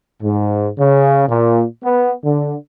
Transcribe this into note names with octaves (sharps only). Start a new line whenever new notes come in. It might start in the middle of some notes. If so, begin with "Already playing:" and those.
G#2
C#3
A#2
B3
D3